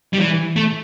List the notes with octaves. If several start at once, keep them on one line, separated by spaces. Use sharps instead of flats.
G3
E3
A3